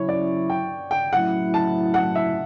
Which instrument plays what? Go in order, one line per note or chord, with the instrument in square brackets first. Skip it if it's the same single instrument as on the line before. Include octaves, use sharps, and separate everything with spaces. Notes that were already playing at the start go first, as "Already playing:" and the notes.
Already playing: [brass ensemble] C#3 F#3 C#4 E4 [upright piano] C#5
[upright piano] D5
G5
G5
[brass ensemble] A2 F#3 C#4 E4 [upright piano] F#5
[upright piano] A5
F#5
E5